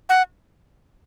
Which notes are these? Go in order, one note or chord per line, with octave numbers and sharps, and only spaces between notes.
F#5